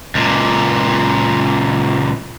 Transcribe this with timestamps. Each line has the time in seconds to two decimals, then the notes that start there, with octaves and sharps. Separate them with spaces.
0.15 C#2 A#2